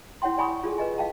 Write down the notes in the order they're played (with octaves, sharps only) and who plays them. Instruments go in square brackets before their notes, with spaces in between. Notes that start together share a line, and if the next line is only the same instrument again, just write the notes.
[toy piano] E4 C#5 F#5 G5 C6
D5 G#5 B5 C#6 D#6
F4 G#4 A4
B4 D#5 G#5
F5 G5 A5